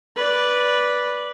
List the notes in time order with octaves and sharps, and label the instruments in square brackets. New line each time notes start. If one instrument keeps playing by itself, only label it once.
[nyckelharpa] B4 D5